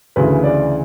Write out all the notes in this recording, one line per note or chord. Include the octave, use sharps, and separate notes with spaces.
D2 C#3 E3 B4
D5